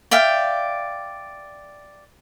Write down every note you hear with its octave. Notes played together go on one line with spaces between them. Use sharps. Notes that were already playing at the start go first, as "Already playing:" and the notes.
D5 E5 F5 G5